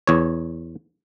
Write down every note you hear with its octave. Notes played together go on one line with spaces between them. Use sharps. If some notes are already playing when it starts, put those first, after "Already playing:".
E2 C#5